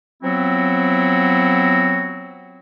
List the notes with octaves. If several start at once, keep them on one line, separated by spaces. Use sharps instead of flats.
F3 F#3 B3 C4 E4 F#4